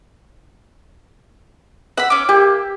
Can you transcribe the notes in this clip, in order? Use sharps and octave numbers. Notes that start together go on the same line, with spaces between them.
E5 F#5 B5 E6
C#4 D6
A#3 G4